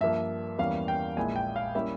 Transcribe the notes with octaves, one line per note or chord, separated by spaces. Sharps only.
G2 F3 A#3 E5
E2 E3 G3 A#3 C#4 F5
G5
A#1 A#2 G#3 E4 G#5
G5
F5
G3 A#3 C#4 E4 E5